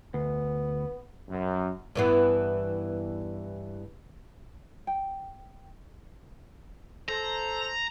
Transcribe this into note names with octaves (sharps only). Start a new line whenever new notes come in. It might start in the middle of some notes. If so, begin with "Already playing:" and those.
D2 B3
F#2
G2 E3 B3
G5
A4 C5 A#5